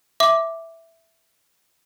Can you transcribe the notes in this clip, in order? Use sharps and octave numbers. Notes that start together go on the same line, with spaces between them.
E5 D6